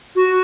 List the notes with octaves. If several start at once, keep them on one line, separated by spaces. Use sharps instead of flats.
F#4